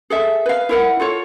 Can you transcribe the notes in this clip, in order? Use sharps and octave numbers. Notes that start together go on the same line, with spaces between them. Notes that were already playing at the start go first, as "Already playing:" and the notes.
G#4 A4 E5
B4 F5
E4 A#4 F#5
F4 A4 C#5